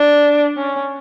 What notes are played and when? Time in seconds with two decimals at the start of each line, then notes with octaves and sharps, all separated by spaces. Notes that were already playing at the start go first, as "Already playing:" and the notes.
Already playing: D4
0.57 C#4